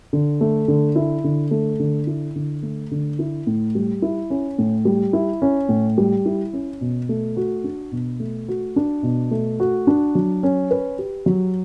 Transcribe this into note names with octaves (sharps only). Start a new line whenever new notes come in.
D3
A3
D3
E4
D3
A3
D3
E4
D3
A3
D3
E4
A2
G3
E4
C#4
A2
G3
E4
C#4
A2
G3
E4
C#4
B2
A3
F#4
D4
B2
A3
F#4
D4
B2
A3
F#4
D4
F#3
C#4
B4
G4
F#3